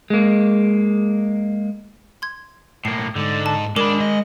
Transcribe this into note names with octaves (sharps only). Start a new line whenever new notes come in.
G#3 A#3
C6 G#6
A2 A#3 C7
G#2 D3 D#4
A5
G#3 D4 A#4 B5 D6 F#7
D#5